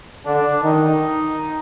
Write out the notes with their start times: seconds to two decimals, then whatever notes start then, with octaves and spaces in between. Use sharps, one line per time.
0.25 D3 D4
0.63 D#3 D#4